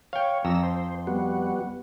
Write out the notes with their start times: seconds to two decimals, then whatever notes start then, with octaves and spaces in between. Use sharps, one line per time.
0.13 C#5 F5 G5
0.45 F2 A#5 E6
0.63 C5
1.07 G3 B3 F#4